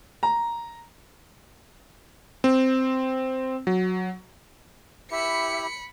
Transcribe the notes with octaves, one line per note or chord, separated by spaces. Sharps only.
A#5
C4
F#3
E4 G4 E5 B5 C#7